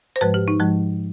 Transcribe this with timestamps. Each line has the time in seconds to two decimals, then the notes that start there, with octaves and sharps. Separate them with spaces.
0.16 C5
0.21 G#2 F3 G#3 B4
0.34 G4
0.48 D#4
0.60 G#2 F3 G#3